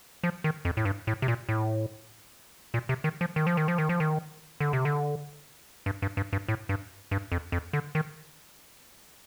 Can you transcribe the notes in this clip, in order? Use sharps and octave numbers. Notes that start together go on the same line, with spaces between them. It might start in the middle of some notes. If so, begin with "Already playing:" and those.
F3
D#3
F2
A2
G2
A2
C3
A#2
A2
A#2
C3
D#3
F3
D#3
F3
D#3
F3
D#3
F3
D#3
D3
C3
D3
G2
G2
G2
G2
A2
G2
G2
F2
F2
D3
D#3